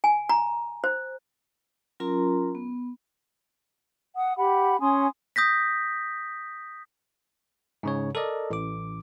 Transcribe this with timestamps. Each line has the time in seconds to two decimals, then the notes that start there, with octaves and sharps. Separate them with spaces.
0.04 G#5
0.29 A#5
0.84 C5
2.00 F#3 C#4 F4 A#4 A#5 C6
2.55 B3
4.16 F#5 D#6
4.37 G4 F#5 B5
4.81 C#4 G#5 C6 D#6
5.36 D#6 G6 A#6 B6
7.83 G#2 C#3 C#5
8.15 A4 A#4 D5 D#5
8.50 A1 D6